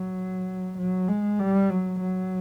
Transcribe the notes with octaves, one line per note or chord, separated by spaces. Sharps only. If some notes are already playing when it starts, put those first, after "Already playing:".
Already playing: F#3
F#3
G#3
G3
F#3
F#3